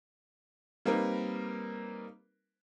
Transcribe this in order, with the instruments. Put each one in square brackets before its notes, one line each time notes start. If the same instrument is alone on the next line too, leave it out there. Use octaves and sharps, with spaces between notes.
[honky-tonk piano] G3 A#3 C4 D#4 A#4 B4